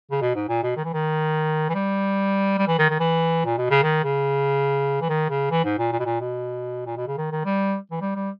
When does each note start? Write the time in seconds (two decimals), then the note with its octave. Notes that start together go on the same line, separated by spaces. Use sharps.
0.11 C#3
0.21 B2
0.35 G#2
0.49 A#2
0.63 B2
0.76 D#3
0.85 E3
0.93 D#3
1.69 E3
1.74 G3
2.58 G3
2.68 E3
2.79 D#3
2.90 D#3
3.00 E3
3.45 A#2
3.57 B2
3.70 C#3
3.83 D#3
4.04 C#3
5.01 E3
5.09 D#3
5.30 C#3
5.51 E3
5.64 G#2
5.78 A#2
5.92 A#2
5.99 B2
6.05 A#2
6.20 B2
6.86 A#2
6.97 B2
7.07 C#3
7.17 D#3
7.32 D#3
7.45 G3
7.91 E3
8.01 G3
8.15 G3